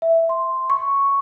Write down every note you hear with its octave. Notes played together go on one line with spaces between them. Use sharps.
E5
C6
C#6